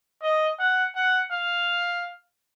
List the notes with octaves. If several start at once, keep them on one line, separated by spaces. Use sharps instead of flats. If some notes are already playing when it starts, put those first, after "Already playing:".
D#5
F#5
F#5
F5